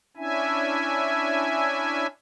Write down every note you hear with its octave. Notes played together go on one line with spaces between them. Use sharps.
C#4 D4 E4 E5 G#5